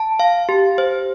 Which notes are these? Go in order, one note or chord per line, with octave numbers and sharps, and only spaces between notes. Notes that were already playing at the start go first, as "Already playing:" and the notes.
Already playing: A5
F5
G4
C5